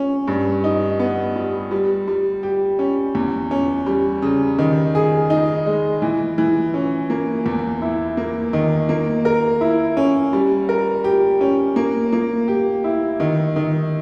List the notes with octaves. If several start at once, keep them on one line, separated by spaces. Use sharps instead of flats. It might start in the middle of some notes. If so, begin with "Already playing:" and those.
Already playing: C#4
G2
D#4
B3
G3
G3
G3
G4
C#4
E2
C#4
G3
C#3
D#3
G#4
D#4
G#3
E3
E3
C#4
A#3
E2
E4
A#3
D#3
A#3
A#4
E4
C#4
G3
A#4
G4
C#4
A#3
A#3
G4
E4
D#3
D#3